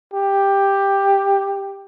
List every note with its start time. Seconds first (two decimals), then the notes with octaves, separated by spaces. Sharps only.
0.13 G4